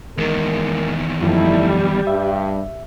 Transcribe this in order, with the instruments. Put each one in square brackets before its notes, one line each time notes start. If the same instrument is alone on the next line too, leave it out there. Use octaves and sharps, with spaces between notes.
[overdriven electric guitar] E2 D#3 [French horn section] G#3 A#4
[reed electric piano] F#2 F3 [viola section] G3 [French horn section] A3 D#4 E4
[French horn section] G2 [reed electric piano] E5